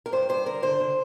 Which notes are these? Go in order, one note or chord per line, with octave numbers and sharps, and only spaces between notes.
A#4
G2 C5
G2 C5
D3 A#4
D3 C5
D3